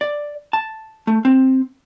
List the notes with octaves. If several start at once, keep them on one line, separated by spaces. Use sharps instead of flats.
D5
A5
A3
C4